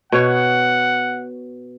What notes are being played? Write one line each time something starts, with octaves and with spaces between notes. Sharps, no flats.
B2 C#5 F#5